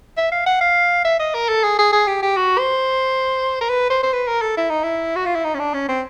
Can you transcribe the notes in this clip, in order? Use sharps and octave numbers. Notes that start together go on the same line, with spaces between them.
E5
F5
F#5
F5
E5
D#5
A#4
A4
G#4
G#4
G#4
G4
G4
F#4
C5
A#4
B4
C5
C5
B4
A#4
A4
E4
D#4
E4
F#4
F4
E4
D#4
C#4
D4
C#4
C4